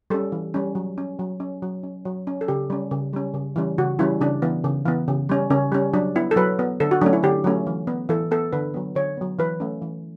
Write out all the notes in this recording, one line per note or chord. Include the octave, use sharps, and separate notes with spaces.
G3 C#4 A4
E3
G3 C#4
F#3
C#4
F#3
C#4
F#3
C#4
F#3
C#4
A4
C#3 G4
G3 C#4
C#3
G3 C#4
C#3
E3 G3 C#4
C#3 F#4
E3 G3 C#4 E4
C#3 D4
E3 B3
C#3
E3 B3
C#3
G3 C#4
C#3 C#4
G3 C#4
F#3 D4
B3 E4
A4
F#3 B4
B3
D3 A4
F#4
F#3 A3 C#4 D4
E4
D3 G4
F#3 A3 C#4
E3
B3
E3 A4
B3 A4
D3 B4
F#3 B3
D3 C#5
F#3 B3
E3 B4
A3 C#4
E3